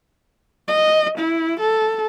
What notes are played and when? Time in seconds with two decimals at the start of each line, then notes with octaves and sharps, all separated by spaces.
0.68 D#5
1.18 E4
1.60 A4